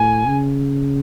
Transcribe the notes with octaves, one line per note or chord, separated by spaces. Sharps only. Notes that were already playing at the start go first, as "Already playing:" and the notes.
Already playing: A2 G#5
C#3